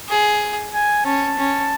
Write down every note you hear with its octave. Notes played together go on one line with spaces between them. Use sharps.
G#4
G#5
C#4 A5
C#4